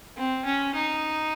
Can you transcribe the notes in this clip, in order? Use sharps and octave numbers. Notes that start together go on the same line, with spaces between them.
C4
C#4
D#4